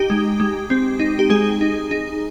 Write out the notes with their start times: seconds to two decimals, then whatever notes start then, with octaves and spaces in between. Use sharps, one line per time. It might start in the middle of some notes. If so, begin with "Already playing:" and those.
Already playing: D#4 G4
0.10 G#3
0.40 G#3
0.70 C4
0.99 D#4
1.19 G4
1.30 G#3 G#4
1.61 D#4
1.91 D#4